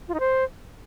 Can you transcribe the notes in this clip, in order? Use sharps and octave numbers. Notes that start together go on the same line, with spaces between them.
F4
D#4
C5